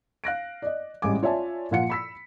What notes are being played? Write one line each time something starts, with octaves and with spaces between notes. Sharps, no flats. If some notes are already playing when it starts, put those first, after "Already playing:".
F5 F#6 A#6 D7
D5 D#5
A1 G3 G#3 G#5 D6
F4 C#5 D5 E5 G#5 A5
A#2 F3 F4 F5 F#5 C#7
B5 E6 B6